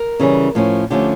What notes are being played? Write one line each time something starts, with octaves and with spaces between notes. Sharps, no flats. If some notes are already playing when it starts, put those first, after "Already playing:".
Already playing: A#4
C#3 E3 G3 C#4
A2 F3 C#4
D3 F3 A3 C#4 G4